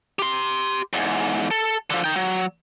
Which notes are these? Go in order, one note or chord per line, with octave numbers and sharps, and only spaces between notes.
G4 C6
E2 G#2
A4
D3 F3
D#4 G5
F#3